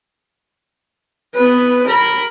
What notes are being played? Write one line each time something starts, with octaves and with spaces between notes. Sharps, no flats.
B3 B4
A#4 B5